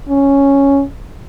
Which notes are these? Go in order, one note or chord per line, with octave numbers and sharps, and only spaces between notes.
C#4